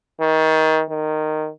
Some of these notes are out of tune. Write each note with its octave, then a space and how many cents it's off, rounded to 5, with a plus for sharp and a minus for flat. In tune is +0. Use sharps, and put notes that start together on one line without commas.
D#3 +25
D#3 -10